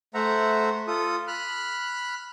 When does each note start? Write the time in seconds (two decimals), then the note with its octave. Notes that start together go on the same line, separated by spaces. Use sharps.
0.14 A3 C5 E5 F#5 A#5
0.87 F4 A4 D#6
1.28 B5 F6 F#6